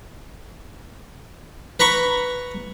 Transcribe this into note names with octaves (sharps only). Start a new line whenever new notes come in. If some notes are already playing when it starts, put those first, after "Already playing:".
B4 A#5 B5 C#6